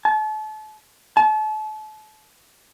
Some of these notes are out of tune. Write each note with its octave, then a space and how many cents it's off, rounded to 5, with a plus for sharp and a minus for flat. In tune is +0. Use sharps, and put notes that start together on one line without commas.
A5 -35
A5 -35